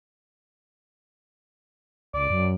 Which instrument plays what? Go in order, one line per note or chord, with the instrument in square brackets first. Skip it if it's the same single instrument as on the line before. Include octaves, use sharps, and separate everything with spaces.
[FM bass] C#2 [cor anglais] D5
[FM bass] F#2